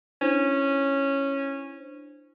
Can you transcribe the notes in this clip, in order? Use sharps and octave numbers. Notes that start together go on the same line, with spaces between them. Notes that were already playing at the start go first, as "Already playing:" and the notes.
C#4 D4 E4 C5